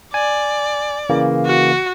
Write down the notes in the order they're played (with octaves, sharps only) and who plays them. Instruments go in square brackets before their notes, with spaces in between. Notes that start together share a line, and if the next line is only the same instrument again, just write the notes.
[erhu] D5 [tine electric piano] G#5
[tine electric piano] C#3 E3 A#3
[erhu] F#4